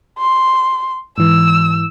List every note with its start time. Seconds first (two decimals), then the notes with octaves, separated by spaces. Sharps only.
0.19 C6
1.18 G#2 E3 E6